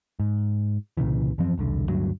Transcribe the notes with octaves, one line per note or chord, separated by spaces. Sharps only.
G#2
C2 A#2 C#3 E3
F#2 E3 F3 C4
E1 C2 D3
D2 G2 F#3